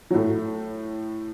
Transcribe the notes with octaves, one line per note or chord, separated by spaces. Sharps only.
F#3
A2 A3